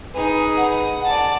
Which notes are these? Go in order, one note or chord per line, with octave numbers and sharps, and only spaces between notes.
D#4 G#4 B4
F#5
D5 A5